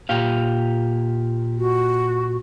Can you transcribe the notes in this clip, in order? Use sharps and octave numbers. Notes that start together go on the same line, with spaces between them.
A#2 G4 F5
F#4